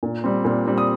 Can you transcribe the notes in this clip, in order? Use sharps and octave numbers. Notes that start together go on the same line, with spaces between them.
A#2
G3 C4
A#2
G3 C4
D#6